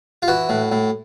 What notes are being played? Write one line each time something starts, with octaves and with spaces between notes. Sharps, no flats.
F4
E3 F#4
A2
A2